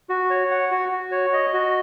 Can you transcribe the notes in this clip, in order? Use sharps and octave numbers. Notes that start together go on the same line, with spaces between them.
F#4
C#5
F#5
F#4
F#4
C#5
D#5
F#4